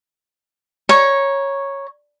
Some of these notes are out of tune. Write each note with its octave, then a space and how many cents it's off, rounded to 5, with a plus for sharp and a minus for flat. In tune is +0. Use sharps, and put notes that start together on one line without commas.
C#5 -5 A#5 +25 C#6 -10